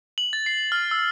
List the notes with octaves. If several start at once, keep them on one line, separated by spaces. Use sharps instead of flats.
F#7
A6
C7
F6
E6